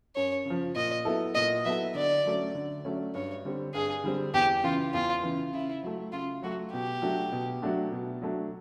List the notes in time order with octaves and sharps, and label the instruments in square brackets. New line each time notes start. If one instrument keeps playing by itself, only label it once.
[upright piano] F#2 [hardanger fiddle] C#5
[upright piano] C#3 F3
[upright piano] A#2 [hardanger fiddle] D#5
[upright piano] F#3 B3 E4 A4
[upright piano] A#2 [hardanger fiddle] D#5
[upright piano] F#3 B3 E4 A4 [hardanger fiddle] E5
[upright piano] D3 [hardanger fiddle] D5
[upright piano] F#3 A3 C#4
D3
F#3 A3 C#4
[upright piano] G2 [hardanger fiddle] C#5
[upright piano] D3 G3 C4
[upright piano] G2 [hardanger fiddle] G#4
[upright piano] D3 G3 C4
[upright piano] E2 [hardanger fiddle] G4
[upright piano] C#3 E3 [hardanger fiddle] F4
[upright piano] E2 [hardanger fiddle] F4
[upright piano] C#3 E3
[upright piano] C#3 [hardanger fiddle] E4
[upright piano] F#3 A3
[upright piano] C#3 [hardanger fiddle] F4
[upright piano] F#3 A3 [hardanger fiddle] F#4
[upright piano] B2 [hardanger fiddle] G4
[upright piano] F#3 A3 D4 F#4
B2
F#3 A3 D4 F#4
B2
F#3 A3 D4